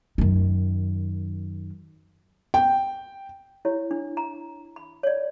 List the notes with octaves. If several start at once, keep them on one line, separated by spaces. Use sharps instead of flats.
F#2 D#3
G5
E4 G4 C#5
D4
A#5
B5
C#5 D5